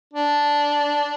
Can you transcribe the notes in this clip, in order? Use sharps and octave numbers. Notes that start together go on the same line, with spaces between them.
D4